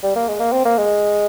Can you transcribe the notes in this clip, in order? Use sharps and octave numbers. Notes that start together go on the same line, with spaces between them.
G3
A#3
G#3
A#3
C4
A#3
G#3